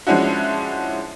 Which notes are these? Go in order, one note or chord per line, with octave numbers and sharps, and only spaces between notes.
F3 G#3 C#4 D4 E4 F#4